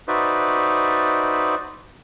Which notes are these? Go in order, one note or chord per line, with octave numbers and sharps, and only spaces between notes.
D#4 F#4 B4 C5 D5 E5